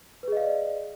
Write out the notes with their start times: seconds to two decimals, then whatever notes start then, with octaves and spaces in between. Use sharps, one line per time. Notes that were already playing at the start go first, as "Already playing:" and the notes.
0.23 B4
0.28 G#4
0.32 D#5
0.37 F5
0.41 D5